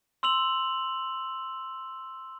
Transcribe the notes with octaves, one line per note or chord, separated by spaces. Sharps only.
C6 E6 F7 F#7